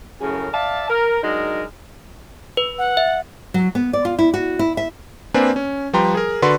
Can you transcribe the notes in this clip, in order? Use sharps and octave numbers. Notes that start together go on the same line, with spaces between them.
F#2 A2 C#3 G#4 A#4
D5 E5 F5 A5
A#4
F#3 G#3 D4 D#4 A#4
B4
F#5
E5
F#3
B3
D5
F4
E4
F#4
E4
E5
A#3 C4 D4 B4 D5 G#5
C#4
F3 G3 B4 G5 A#5 C6
G#4 A#4
D3 F#4 B4 D5 C6